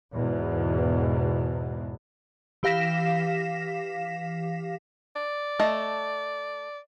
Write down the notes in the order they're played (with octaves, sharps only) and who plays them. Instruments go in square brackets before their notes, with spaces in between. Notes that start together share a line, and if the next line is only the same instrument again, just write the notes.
[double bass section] E2 G#2 B2
[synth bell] E3 G4 F5 A#6 B6 E7
[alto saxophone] D5
[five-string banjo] A3 D#5 A5